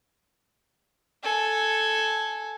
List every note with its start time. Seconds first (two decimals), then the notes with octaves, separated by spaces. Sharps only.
1.23 A4 G#5